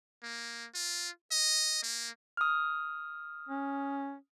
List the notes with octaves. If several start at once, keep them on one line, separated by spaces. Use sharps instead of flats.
A#3
F4
D#5
A#3
D#6 F6
C#4